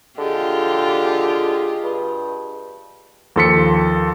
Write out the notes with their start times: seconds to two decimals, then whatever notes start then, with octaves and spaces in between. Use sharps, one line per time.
0.18 D3 F4 G4 G#4 D#5
1.83 G2
3.36 D#2 F3 A4 C6 B6 C#7